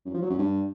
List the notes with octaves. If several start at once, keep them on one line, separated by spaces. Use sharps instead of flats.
F#2
F3
F#3
F#2
G2